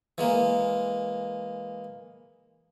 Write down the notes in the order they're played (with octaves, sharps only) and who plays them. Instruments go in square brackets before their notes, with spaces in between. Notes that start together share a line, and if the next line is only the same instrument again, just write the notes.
[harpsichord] E3 G#3 A#3